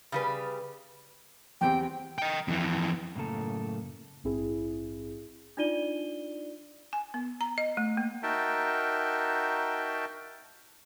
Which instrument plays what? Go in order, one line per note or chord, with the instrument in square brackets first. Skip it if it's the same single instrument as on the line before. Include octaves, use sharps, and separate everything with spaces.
[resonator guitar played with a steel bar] C#3 G3 B4
[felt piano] E2 C4 G4 [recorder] G5
[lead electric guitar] D#5 G5
F2 E3
[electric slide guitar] F#2 A2 C#3 A#3 A4
[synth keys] A#1 G#2 C4 E4 G#4
[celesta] D4 D#4 F4 D5 D#7 G7
[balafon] G#5
B3
A#5
D#5
A3
A#3
[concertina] D#4 F#4 A#4 E5 G5 A5